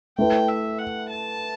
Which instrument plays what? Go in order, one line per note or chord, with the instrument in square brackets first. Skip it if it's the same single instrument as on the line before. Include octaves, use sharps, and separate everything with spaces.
[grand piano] A3 E4 B4 [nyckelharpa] G5
[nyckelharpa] E5
F#5
A5